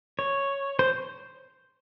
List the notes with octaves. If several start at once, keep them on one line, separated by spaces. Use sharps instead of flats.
C#5
C5